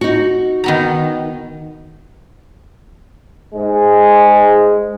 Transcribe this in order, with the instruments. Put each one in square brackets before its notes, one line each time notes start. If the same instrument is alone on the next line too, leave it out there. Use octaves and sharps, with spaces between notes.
[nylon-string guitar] D#4 F#4
[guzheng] D#3 B3 A#5
[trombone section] G#2 G#3